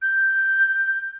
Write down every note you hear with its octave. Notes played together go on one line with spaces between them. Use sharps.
G6